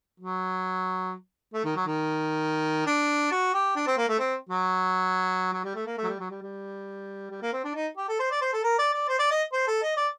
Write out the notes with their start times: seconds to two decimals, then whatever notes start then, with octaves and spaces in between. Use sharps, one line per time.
0.20 F#3
1.54 A3
1.64 D#3
1.76 F#3
1.86 D#3
2.87 D4
3.31 F#4
3.54 G4
3.76 D4
3.87 C4
3.97 A#3
4.08 A3
4.19 C4
4.49 F#3
5.53 F#3
5.64 G3
5.75 A3
5.86 A#3
5.97 A3
6.03 F#3
6.09 G3
6.19 F#3
6.31 G3
6.42 G3
7.30 G3
7.42 A#3
7.53 C4
7.64 D4
7.75 D#4
7.97 G4
8.08 A4
8.19 C5
8.31 D5
8.41 C5
8.53 A4
8.64 A#4
8.79 D5
8.94 D5
9.08 C5
9.19 D5
9.31 D#5
9.52 C5
9.67 A4
9.82 D#5
9.97 D5